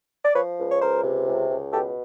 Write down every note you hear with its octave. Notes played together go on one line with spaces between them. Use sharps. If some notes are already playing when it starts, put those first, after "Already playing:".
D5
F3 B4 C#5
C#2
C#5
C#2 A#4 C5
C3
C#2
C#2
B2 G4 A4